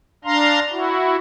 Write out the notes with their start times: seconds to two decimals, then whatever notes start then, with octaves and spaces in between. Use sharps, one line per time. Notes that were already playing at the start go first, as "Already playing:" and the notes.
0.25 D4 F5 A#5 C6
0.72 E4 F#4